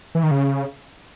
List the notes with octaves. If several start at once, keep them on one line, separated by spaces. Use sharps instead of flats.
E3
D#3
C#3